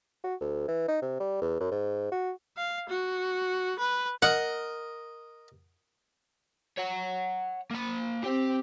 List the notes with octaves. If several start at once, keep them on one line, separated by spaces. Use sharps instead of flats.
F#4
D2
E3
D#4
C3
G3
E2
F#2
G#2
F#4
F5
F#4
B4
A#4 D#5 F#5
C#5 F#5
A#3 B5
C4 G4